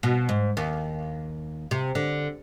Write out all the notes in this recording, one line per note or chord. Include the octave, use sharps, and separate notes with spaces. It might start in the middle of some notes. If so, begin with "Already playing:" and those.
B2
G#2
D#2
C3
D3